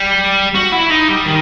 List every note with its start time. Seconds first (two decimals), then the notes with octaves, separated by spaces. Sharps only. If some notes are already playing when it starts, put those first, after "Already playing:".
Already playing: G3
0.55 F#4
0.73 E4
0.91 D#4
1.09 G3
1.25 D#3